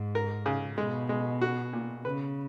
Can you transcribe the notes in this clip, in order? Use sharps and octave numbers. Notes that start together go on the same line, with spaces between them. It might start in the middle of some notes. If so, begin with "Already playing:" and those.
Already playing: G#2
A#4
C#3
B2 G#3
G#3
F#4
A#2
C#3 B4